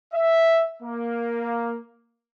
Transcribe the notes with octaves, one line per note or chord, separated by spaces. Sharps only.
E5
A#3